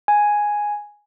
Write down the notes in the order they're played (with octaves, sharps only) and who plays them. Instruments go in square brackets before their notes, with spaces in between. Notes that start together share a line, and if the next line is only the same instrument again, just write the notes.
[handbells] G#5